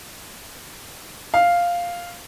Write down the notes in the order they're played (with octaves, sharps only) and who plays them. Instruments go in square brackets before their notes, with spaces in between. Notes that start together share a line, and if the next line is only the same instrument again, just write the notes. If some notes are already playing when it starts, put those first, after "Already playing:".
[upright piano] F5